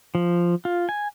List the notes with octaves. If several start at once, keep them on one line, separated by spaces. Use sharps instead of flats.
F3
F4
G#5